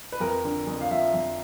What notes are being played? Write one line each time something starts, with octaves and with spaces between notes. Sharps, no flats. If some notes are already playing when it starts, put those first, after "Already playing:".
B4
F2 A#4
D3
F2
F5
F3 E5
F2